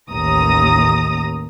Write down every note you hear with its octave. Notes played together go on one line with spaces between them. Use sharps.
A1 D#2 A#5 D#6 A#6